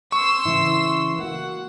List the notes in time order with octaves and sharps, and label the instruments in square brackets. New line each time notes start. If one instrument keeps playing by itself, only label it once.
[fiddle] C6 E6 [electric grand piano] C#6
[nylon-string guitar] C#3 E3 E4
[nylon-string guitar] A#3 F#4 [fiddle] F#5